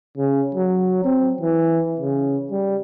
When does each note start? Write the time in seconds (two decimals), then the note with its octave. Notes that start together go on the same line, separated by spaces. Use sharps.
0.18 C#3
0.55 F#3
1.04 C4
1.41 E3
2.00 C#3
2.51 G3